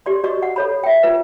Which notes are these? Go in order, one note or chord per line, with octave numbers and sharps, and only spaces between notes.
G4 D5 C6
F#4 D5 D#5 C#6
F#5
A4 C#5 B5
E5 G5
F4 B4